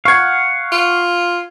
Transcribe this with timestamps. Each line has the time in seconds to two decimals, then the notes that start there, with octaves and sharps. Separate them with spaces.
0.05 F5 F#5 C#6 G#6
0.72 F4